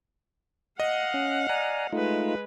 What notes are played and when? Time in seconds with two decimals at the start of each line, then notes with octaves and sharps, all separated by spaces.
0.80 D#5 F5 F#5
1.14 C#4
1.49 D5 G#5 A#5
1.93 G#3 A3 D#4 F4 B4